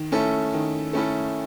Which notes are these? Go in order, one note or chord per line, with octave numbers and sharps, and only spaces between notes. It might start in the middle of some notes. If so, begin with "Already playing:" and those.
Already playing: D#3
A3 C#4 E4 A4
D#3
A3 C#4 E4 A4